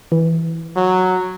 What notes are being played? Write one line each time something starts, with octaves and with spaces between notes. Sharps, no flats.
E3
F#3